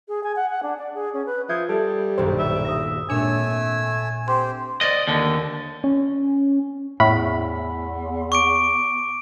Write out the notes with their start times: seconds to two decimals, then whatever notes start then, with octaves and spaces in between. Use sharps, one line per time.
0.08 G#4
0.23 G#5
0.36 F#5
0.50 F#5
0.63 D4
0.78 D5
0.94 G#4
1.13 C#4
1.26 B4
1.49 F3 E5 D#6 G6 G#6
1.69 G3 A4
2.18 D#1 B1 G2 C5
2.39 E5
2.65 D#6 A#6
3.10 G#1 A#2 A3 D4 C#5 G#5 E6
4.28 C4 G4 C5 C6
4.81 D5 D#5
5.07 D#2 D3
5.84 C#4
7.00 E2 A2 B5
8.32 C#6 D6 D7